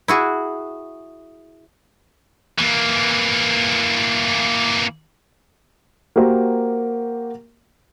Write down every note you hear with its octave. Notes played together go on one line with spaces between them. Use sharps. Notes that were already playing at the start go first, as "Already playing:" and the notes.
E4 F#4 G#4
E3 A#3
A#3 F#4 G4 A#4 C5 A#5